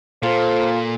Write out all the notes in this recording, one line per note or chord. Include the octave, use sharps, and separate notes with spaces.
A#2 F4 A4 C5